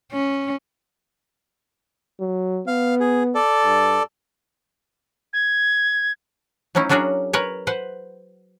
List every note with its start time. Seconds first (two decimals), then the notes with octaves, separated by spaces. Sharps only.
0.12 C#4
2.21 F#3
2.67 B3 F5
3.00 G#4
3.35 A4 D5
3.63 G2
5.33 G#6
6.75 F#3 A3 C#4 D#4 E4
6.89 F#3 C#4 D4 F#4 G#4 A#4
7.33 A#4 B4 C#5
7.67 B4 C5 F#5